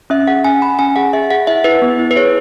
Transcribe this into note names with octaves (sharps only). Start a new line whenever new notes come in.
C#4 E5
G#4 F#5
C#4 G#5
C#4 B5
C#4 G#5
G#4 F#5
G#4 E5
G#4 F#5
E4 E5
E4 B4
B3
E4
B4
G#4 C#5